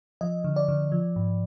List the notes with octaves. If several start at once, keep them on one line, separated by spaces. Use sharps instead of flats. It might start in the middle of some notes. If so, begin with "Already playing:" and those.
F3 D#5
D3
D5
D3
F3
G#2